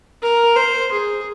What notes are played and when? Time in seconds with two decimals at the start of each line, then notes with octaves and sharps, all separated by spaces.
0.22 A#4
0.56 C5
0.92 G#4